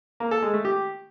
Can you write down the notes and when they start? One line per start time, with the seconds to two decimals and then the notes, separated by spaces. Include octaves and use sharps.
0.20 A#3
0.31 A4
0.42 G#3
0.54 A3
0.65 G4